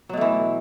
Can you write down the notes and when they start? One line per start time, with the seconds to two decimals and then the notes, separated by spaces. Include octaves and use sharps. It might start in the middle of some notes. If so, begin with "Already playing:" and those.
0.09 F#3
0.13 B2
0.17 A3
0.21 E3